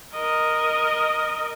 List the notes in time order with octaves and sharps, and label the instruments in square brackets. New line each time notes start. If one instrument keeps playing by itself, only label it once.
[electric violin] A#4 D#5